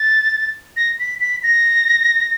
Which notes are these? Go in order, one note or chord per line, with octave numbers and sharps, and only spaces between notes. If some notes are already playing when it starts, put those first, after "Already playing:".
Already playing: A6
A#6
B6
B6
A#6